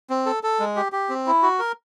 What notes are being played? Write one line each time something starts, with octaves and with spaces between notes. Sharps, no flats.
C4
A4
A4
G#3
G4
G4
C4
E4
F#4
A#4